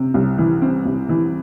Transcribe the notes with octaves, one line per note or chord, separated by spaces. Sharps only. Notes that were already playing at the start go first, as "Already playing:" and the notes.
Already playing: C3 C4
C2
E3
C4
C2
E3